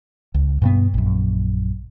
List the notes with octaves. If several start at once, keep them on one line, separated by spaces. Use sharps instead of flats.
C#2
G2 B2 B3
A#1 F#2